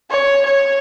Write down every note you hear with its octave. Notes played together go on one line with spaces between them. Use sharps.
C#5
C#5